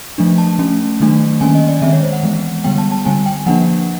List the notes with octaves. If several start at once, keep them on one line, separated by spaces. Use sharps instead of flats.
F3 A3 D4
A5
F3 A3 C#4
D#3 F#3 A3 D4
D#3 G3 A#3 C#4 G#5
D#5
D5
D#3 G#3 C4 E5
C#5
C5
F#5
E3 G#3 B3
D3 G3 B3 G5
A5
A5
D3 G3 C4 G#5
G5
F3 A#3 D4 F#5